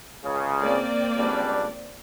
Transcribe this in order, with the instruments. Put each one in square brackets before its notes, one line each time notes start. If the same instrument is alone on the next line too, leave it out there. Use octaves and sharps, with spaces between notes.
[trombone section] C#2 C#3
[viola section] A#3 C4 D5
[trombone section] C#2 G3 D4